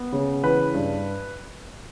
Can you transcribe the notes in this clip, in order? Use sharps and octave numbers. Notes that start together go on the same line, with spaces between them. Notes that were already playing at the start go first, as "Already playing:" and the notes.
Already playing: B3
C#3
E3 B4
G2